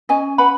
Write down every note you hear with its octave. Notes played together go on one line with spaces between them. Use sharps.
C#4 D#5 G#5
B4 F#5 B5